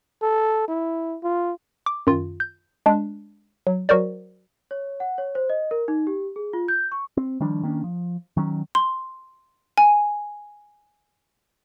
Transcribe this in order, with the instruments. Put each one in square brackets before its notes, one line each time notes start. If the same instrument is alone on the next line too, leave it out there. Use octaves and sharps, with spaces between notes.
[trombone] A4
E4
F4
[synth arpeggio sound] D6
F#2 D#3 F4
G6
G#3 D4
F#3
F#3 F#4 A#4 C5 D5
[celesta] C#5
F#5
C#5
C5
D#5
A#4
D#4
G4
G#4
F4
G6
C#6
[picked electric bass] C4
D#3 F3 G3 D4
D#3 A#3 C#4 D4
F3
D#3 F#3 C#4
[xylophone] C6
G#5